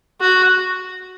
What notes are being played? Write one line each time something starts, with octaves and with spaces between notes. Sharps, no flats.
F#4